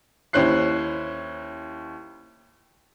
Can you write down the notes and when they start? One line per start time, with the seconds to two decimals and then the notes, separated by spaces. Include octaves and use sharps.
0.33 D#2 C#4 E4 C5 F#6 C7